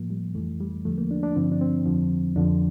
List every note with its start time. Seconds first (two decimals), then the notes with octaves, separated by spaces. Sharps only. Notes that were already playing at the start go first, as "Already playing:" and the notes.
Already playing: A2 F3 A#3
0.10 G3
0.35 F2 E3 A3
0.60 G3
0.85 E2 D3 F3 A3
0.98 A#3
1.11 D4
1.23 D4
1.36 G2 D3 F3 C4
1.52 D4
1.61 C4
1.86 F2 D3 F3
2.36 F2 D3 F3 D4